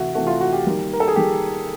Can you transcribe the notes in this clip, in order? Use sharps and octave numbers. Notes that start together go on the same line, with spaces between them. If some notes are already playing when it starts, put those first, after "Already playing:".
Already playing: C3 E3 A3 E4 F#4
C3 E3 A3 F#4
F4
F#4
G4
D#3 G3 A#3
A#4
A4
G#4
D#3 G3 A#3 G4